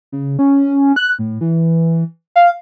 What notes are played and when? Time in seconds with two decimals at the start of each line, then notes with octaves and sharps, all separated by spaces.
0.12 C#3
0.39 C#4
0.96 F#6
1.19 A2
1.41 E3
2.36 F5